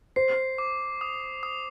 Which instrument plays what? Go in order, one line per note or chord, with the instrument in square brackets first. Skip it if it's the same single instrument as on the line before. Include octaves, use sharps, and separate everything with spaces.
[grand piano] C5 [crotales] C7
[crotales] D6
D#6
D#6